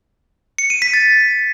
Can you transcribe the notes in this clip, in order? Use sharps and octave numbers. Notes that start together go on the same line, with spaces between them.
C#7
D#7
B6
A6